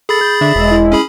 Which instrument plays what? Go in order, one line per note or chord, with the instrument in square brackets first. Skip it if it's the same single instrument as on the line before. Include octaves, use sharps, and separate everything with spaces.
[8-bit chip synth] G#4 B5 A6 [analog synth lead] A4
[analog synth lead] G6
[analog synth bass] D3 [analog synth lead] E5
[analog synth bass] E1 [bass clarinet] G#3
[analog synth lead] E4
[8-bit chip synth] C#4 G#4 B5